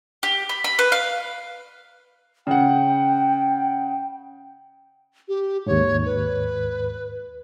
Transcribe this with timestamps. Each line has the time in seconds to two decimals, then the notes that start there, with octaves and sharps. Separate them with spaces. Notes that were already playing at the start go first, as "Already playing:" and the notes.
0.23 G4
0.49 B5
0.64 B5
0.79 B4
0.92 F5
2.47 C#3 F#5 G5
5.28 G4
5.66 D#2 G#2 C#5
6.06 B4